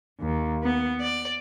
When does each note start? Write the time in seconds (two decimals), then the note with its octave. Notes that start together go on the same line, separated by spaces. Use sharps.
0.20 D#2
0.62 B3
1.00 D5